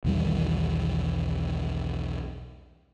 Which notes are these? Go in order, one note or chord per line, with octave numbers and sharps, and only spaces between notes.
B1 E2 D#3 G3